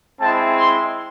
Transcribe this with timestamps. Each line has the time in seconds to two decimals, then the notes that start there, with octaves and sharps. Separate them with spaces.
0.20 G#3 C4 E4 A5
0.56 C6